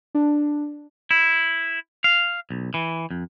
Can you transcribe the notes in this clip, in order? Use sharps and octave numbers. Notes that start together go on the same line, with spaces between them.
D4
E4
F5
B1
E3
F2